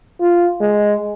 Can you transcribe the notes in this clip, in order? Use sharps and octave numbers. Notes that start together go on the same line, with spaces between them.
F4
G#3